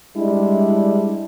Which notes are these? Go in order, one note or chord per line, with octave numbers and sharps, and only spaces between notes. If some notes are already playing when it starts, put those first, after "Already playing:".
G3 G#3 D4 E4